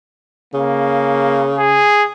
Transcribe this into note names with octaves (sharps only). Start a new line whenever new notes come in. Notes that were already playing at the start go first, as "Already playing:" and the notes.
C#3 A#3
G#4